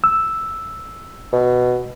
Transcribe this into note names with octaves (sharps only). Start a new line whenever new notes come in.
E6
B2